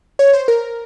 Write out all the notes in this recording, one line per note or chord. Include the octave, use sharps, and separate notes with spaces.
C#5
C5
A#4